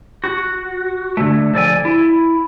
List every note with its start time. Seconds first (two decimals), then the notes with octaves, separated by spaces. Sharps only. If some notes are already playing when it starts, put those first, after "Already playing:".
0.24 F#4
1.17 D3 A3
1.54 F3 A4 D5 G#5
1.85 E4